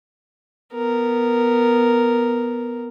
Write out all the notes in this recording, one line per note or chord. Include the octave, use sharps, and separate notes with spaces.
B3 A#4